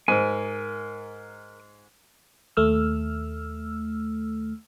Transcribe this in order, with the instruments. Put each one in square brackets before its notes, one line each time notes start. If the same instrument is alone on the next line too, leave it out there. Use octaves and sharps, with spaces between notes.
[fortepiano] G#2 [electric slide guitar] A#4 G#5
[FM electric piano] D#2 A3 E6 F6